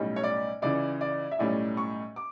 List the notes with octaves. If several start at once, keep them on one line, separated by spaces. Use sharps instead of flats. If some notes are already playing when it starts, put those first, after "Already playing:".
Already playing: B1 A2 G3 C#4
C#5
D5
C#2 C#3 E3 D5
D5
E5
B1 A2 G3 C#4 D5
C#6
D6